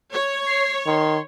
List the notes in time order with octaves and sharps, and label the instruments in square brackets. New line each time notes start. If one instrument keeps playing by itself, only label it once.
[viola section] C#5
[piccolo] C7
[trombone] D#3 [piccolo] C6